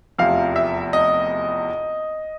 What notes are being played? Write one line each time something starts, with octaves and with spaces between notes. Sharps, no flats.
F1 E2 C3 F3 F5
E5
D#5